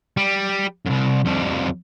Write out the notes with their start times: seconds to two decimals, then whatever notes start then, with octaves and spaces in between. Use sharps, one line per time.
0.17 G3
0.86 C2 F#2
1.25 F2 G3